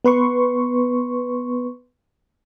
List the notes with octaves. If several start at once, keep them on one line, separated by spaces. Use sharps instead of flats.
B3 B4 C6 C#6